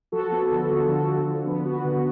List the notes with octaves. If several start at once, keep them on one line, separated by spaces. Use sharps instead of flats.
F3 F#4 A4
B3
D3
F3
D3
F3
D3
B3
B3 F#4
D3